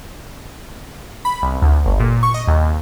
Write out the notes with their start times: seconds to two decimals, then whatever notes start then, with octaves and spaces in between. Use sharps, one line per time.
1.25 B5
1.42 C2
1.62 D2
1.86 G1
2.00 A#2
2.23 C#6
2.34 D#5
2.47 D#2